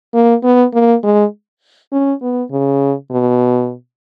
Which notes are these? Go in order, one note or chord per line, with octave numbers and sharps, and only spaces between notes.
A#3
B3
A#3
G#3
C#4
B3
C#3
B2